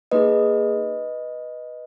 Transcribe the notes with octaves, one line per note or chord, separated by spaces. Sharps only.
A#3 D#4 G#4 B4 D#5